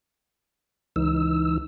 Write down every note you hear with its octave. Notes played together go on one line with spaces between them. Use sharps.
C#2 E3 D#4 E6